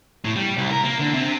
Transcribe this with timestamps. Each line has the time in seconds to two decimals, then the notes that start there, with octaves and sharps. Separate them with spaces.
0.25 A2
0.36 G3
0.58 C2
0.71 A#4
0.84 A#3
0.99 D3
1.14 C3